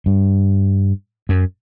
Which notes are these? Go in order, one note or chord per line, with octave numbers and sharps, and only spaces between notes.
G2
F#2